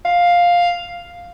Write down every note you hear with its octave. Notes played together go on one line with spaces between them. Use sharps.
F5